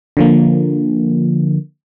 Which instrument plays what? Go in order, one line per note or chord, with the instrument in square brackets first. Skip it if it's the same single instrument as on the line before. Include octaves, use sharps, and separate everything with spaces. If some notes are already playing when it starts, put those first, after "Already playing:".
[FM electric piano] D3 F3 A#3